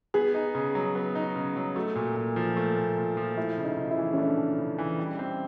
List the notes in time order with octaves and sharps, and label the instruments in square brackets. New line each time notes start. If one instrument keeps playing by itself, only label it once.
[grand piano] B3 [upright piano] G#4
[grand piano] D#4
C#3
F#3
B3
D#4
C#3
F#3
[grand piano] A3 [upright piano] F#4
[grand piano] A#2
A#2
F3
A3
A#2
A#2
F3
[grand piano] A3 [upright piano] E4
[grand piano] C#3
[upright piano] D#4
[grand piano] C#3
[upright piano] E4
[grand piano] E3
[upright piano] C#4
[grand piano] A3 [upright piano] D4
[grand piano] C#3
C#3
E3
G3
C4